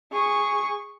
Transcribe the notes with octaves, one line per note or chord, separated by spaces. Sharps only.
G#4 C#6